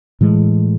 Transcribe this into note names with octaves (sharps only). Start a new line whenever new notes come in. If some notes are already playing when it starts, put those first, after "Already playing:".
A2 E3 G#3